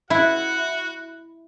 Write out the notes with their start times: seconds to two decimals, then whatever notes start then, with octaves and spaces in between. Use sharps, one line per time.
0.10 E4 F#4 F#5